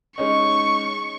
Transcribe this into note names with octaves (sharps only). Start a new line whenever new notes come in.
G#3 C#4 D#4 C#6